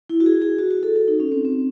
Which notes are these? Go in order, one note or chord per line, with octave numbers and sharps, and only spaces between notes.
E4
F#4
G#4
G#4
F#4
F#4
A4
A4
D#4
C#4
C4
C4